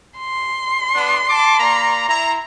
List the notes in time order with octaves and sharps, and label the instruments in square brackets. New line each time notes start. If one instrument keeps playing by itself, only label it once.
[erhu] C6
[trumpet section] B3 D4
A5 D6
A#3 D5 A#5
E4 A#5